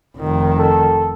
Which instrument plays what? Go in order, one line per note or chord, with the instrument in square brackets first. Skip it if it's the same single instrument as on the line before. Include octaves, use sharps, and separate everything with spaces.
[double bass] F1 D#3
[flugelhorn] A4